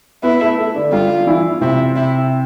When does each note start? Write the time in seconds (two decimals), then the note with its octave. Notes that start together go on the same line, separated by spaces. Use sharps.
0.23 B3 E4 B4
0.41 A3 A4
0.58 A3 A4
0.75 D3 D4
0.92 G2 G3 F4
1.21 D4
1.27 E3 E4
1.61 C3 C4 E4
1.96 E4